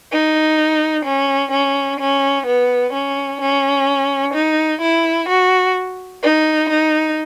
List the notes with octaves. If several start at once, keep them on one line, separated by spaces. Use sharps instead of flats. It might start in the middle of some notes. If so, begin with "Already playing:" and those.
D#4
C#4
C#4
C#4
B3
C#4
C#4
D#4
E4
F#4
D#4
D#4